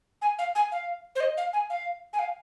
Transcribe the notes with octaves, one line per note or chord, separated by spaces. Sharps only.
G#5
F5
G#5
F5
C5
D#5
F5
G#5
F5
G#5
F5